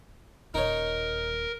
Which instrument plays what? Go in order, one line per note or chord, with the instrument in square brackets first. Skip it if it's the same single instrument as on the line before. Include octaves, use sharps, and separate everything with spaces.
[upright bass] D#1 D#2 [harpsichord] D#4 C#5 [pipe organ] A#4